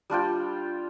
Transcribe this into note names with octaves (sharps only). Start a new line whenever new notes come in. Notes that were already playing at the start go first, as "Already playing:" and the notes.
G3 D4 F4 G5